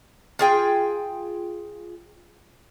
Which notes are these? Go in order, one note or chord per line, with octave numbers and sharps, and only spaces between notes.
F4 G#4 G5